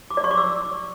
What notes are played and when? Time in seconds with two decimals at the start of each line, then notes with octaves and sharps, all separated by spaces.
0.11 D6
0.17 D5
0.24 C#6
0.31 D6
0.37 E6